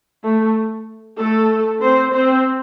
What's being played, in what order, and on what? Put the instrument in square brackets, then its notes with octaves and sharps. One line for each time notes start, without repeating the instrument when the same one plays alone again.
[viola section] A3
A3 A4
C4 C5
C4 C5